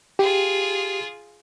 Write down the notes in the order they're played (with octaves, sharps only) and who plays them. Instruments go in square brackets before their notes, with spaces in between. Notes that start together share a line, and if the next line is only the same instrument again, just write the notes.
[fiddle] F4 G#4 [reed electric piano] G4